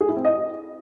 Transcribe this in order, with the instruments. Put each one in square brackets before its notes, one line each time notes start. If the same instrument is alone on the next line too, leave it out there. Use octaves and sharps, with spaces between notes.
[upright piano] G#4
E4
C4
D#5